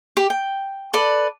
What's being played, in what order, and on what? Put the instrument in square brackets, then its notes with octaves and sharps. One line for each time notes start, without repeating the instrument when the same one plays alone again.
[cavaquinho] G4 D6
G5
A4 B4 D5